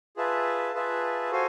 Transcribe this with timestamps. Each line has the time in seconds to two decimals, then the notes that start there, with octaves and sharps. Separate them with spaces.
0.17 F4 G#4 B4 E5 A5
0.74 F4 G#4 B4 E5 A5
1.31 F#4 A4 C5 F5 G#5